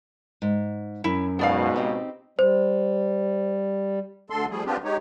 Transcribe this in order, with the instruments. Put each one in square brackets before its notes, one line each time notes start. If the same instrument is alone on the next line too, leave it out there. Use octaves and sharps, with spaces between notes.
[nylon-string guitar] G#2
[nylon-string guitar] F#2 [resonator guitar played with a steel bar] E4
[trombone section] C#2 G#2 B2 [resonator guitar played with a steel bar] B3 D5 F5
[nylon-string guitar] C4 D#4 G4
[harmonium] G3 [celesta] C5
[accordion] D2 D3 A4 C6
F3 G3 A3 G#4
B3 C4 D4 F4 G4
G#3 D#4 G4 C#5